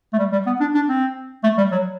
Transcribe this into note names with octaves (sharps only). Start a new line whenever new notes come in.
A3
G3
G3
B3
D4
D4
C4
A3
G3
F#3